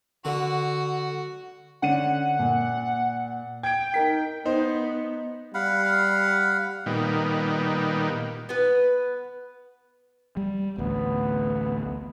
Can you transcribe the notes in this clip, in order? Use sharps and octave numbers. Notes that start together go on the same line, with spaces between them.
D3 F#4
D3 C#4 F#5 D#7
A#2
G5 G#6 D7
D#4 A#4 B6
B3 D#4 C5
G3 F5 F#5 B5
A#2 D#3 G3 B3
B3 B4
G3
A1 D2 B3